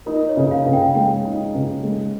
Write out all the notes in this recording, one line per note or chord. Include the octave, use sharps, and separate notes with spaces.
D#4 A#4
C#5
C#3
F5
C#3
G5
G#3 G5
D#4
C#3
G#3